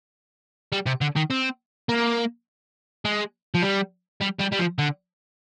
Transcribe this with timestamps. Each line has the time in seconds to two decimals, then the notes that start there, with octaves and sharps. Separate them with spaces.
0.73 G3
0.86 C3
1.01 D3
1.16 D#3
1.30 C4
1.89 A#3
3.05 G#3
3.54 F3
3.62 G3
4.21 G3
4.39 G3
4.52 G3
4.59 F3
4.78 D3